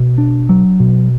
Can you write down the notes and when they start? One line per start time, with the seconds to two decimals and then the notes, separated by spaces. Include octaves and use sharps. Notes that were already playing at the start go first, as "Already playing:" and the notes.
Already playing: B2
0.18 D4
0.49 F#3
0.80 B2